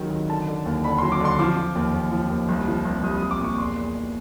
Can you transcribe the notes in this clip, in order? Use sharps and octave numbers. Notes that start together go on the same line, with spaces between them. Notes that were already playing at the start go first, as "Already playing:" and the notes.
Already playing: C#2 C3 D#3 F#3
D#3
D3 A5
D3
D#2
D3 B5
F#3 C6
D6
D3 C6
F3 D6
F3
D#2
D#2
F3
D#2
C2
F3
C2
C2 D#6
D#6
C2
D6
A#2 C#6
E2 C6
E2
E2